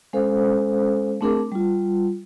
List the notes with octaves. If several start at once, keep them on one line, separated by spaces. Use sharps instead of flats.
G#3 C#4 A4 C5 F5
A3 C4 D4 G#4 A#4 D6
G3 F4